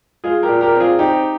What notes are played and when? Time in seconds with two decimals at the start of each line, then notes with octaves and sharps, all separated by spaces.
0.24 G#3 F4 G#4
0.43 G4 A#4
0.49 A#2
0.61 G4 A#4
0.75 C4
0.80 F4 G#4
0.99 C4 D#4 G4